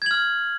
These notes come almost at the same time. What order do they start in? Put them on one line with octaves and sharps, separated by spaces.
G#6 F#7 F6